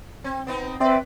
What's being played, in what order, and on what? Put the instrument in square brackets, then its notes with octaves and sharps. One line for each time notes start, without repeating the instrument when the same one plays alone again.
[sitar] C4
B3 C4 D#4
[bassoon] C4 [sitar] B4 D5 [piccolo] E5